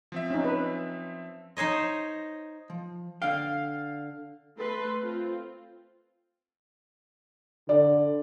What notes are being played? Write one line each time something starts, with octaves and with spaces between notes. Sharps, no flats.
F3 C4 E5
C#4 D#4
B4
D#4 C5 C#5 D#5
F3
D3 F5 G5
A3 A4 B4 C6
C4 F4
D3 D5